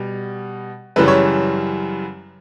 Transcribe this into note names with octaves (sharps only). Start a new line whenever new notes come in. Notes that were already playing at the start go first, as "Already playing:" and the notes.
Already playing: B2 G3
F#2 C#3 E3 G3 B4
C#5